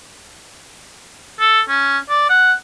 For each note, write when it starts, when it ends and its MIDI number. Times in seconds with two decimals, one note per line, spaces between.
1.40 1.60 69
1.69 1.98 61
2.10 2.27 74
2.29 2.53 78